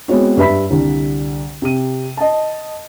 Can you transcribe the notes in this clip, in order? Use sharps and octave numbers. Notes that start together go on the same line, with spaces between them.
G#3 B3 C4 F#4 C#5
G2 B4 E5 B5 B6
C2 D3
C3 D#7
D#5 A5